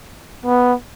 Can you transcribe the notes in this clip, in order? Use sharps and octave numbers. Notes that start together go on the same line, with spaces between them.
B3